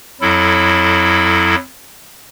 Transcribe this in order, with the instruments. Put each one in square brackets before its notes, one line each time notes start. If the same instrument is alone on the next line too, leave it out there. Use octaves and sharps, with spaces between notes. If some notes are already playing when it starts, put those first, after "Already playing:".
[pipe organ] F2 F#3 E4 A4